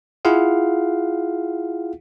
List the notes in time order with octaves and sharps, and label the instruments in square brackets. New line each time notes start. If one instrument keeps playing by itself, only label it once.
[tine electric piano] E4 F4 G#4 F5 F#5